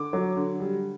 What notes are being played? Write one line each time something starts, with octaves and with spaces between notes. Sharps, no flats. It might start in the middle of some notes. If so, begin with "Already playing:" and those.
Already playing: D3 D6
F#3
D3
G3